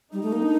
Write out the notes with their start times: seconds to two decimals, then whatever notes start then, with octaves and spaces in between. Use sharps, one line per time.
0.13 G3 D#4
0.23 A3
0.33 A#3
0.42 D4